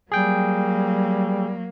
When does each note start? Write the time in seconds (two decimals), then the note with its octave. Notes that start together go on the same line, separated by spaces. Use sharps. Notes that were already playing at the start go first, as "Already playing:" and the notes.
0.12 F#3 G3 A#3 G#4 G5